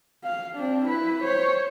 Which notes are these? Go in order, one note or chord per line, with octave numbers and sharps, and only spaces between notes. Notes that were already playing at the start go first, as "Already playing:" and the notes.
F5
C4 D4
E4 B4
C5 C#5